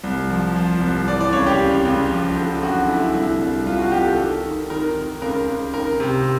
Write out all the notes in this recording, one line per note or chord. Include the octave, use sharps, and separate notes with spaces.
C2
F3
F3
C2
E3 D5
D5
C#2 C#5
G4
C#2
C#2
F3
D3
F#2 F#4
D3 E4
C2 E4
C2
C2 F4
F#4
C2 G4
A4
D#3
D#3
D#3 A#4
D#3
C#2 A#4
C#2
D#3 A#4
C3